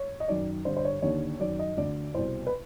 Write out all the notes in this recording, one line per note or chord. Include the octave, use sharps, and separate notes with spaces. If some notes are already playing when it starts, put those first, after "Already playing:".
Already playing: C#5
D#5
F#2 D#3 D5
G2 D3 C5
C5
C#5
D#2 D3 C#5
F#2 D#3 D5
D#5
D2 D3 D5
C2 B2 C5
B4